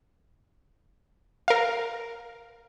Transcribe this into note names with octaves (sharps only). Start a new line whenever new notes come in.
A#4 F5